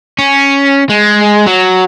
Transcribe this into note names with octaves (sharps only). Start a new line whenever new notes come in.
C#4
G#3
F#3